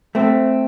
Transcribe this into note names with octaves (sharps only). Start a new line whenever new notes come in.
A3 C4